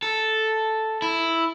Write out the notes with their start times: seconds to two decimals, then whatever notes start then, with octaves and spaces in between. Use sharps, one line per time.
0.02 A4
1.02 E4